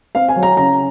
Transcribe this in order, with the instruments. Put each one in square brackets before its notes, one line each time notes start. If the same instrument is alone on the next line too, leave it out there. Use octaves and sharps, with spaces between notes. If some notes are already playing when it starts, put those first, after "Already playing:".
[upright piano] C4 F5
G#5
F#3
A#5
C#3 A#5